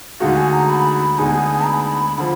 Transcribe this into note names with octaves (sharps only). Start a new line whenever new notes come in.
D2 D3 G#3 D#4 F#4 F5
G#5
A#5
B5
D2 D3 G#3 B3 D#4 G#5
B5
D3 F3 B5